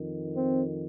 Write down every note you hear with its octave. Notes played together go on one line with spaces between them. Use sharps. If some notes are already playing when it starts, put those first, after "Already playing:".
Already playing: F2 D#3
C4